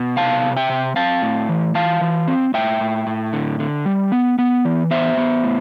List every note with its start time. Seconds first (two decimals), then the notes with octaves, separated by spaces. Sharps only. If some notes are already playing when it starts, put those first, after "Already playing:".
Already playing: B2
0.17 C3 F5 A5
0.43 C3
0.56 E5 G5
0.70 C3
0.96 C4 F5 A5
1.22 A2
1.49 E3
1.75 E3 F5 A5
2.01 E3
2.28 C4
2.54 A2 E5 G5
2.80 A2
3.07 A2
3.33 D3
3.60 D3
3.85 G3
4.12 B3
4.39 B3
4.65 E3
4.91 B3 C5 E5
5.17 B3
5.44 A2